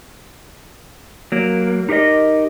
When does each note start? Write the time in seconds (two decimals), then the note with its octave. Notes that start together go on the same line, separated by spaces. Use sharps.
1.32 F#3 A#3
1.89 D#4 G4 A#4 C#5 D#5